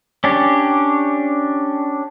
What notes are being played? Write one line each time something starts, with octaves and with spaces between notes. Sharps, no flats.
C#4 D4 G4